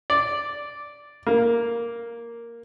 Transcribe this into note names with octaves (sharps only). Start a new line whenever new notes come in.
D5
A#3